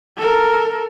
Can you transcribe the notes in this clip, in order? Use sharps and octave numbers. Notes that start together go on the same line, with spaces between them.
A4 A#4